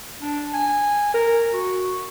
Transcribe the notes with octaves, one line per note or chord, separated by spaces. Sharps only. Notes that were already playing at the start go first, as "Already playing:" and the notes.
D4
G#5
A#4
F#4